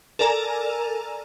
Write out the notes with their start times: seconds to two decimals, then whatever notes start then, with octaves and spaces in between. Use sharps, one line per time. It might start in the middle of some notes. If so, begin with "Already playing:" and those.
0.19 A4 A#4 D5 G#5 A#5